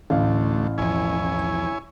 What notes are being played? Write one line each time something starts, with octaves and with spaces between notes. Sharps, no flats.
A1 D2 A3 F5
B1 E2 F3 E4 C#5 G#5